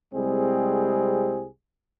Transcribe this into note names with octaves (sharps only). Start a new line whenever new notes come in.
C2 G3 G#3 C4 G#4